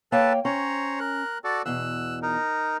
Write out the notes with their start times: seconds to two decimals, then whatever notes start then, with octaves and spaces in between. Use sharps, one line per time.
0.12 A#3 A4 B4 C#5 G5 A5
0.45 C#4 C5 C#5 A#5
1.00 A#4 F#6
1.44 F#4 A4 D5
1.66 E2 B2 E6 F#6
2.22 D#4 A#4